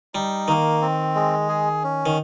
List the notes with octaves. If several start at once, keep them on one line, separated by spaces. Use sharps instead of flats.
G3 D#4
D#3 A#3
C4
G#3
G#4
C#4
D#3